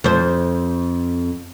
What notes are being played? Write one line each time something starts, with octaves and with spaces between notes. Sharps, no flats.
F2 C5